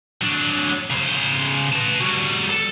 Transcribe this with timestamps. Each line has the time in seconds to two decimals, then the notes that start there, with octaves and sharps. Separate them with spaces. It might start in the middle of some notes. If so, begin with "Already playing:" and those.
0.22 F#3 D4
0.90 C#3 C5
1.73 B4 A5
2.00 G3 F#4
2.50 A4